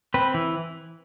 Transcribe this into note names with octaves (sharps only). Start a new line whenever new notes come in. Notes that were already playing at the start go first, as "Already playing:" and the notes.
C4 B4
E3